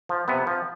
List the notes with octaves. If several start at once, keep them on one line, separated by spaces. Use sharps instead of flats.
F3
C3 B3
F3